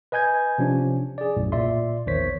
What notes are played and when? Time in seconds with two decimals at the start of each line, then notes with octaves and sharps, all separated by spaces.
0.12 B4 D#5 G#5 G6 G#6
0.58 C3 F3 C#4 D4
1.18 G#4 D5
1.37 B1 F#2 A2
1.52 A#2 D5 E5 C6
2.06 A#1 E2 D#3 C5 C#5 B6